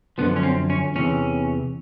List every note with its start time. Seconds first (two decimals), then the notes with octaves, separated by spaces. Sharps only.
0.18 F#2 D3 F3 B3
0.36 C#4
0.43 C4
0.70 C#4
0.95 E2 C3 E3 C#4